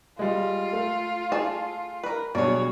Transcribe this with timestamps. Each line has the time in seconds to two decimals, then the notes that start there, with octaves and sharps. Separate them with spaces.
0.19 G3 G#3 F4
0.73 A3
1.32 G#4 A4 A5
2.04 A#4 B4
2.35 G2 B2 F#3 G#4 C#5 D5